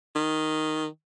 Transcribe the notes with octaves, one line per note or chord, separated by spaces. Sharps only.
D#3